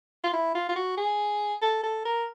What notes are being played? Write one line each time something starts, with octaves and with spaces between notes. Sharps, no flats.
F4
E4
F4
F4
F#4
G#4
A4
A4
A#4